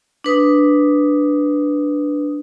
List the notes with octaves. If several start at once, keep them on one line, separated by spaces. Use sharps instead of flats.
D4 B4 D#6